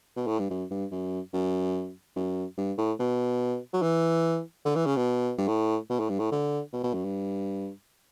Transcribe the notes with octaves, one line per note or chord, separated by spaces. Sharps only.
B2
A2
G2
F#2
G2
F#2
F#2
F#2
G2
A2
B2
F#3
E3
D3
E3
C#3
B2
G2
A2
B2
A2
G2
A2
D3
B2
B2
F#2
G2